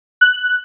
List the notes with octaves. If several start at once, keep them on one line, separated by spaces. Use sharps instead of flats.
F#6